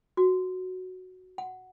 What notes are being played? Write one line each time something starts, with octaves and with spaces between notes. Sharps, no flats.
F#4
F#5